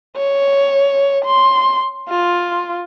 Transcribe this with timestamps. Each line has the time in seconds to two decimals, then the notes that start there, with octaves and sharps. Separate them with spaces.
0.17 C#5
1.25 C6
2.10 F4